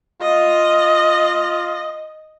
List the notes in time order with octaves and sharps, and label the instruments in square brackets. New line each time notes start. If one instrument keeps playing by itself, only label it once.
[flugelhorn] F4 [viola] D#5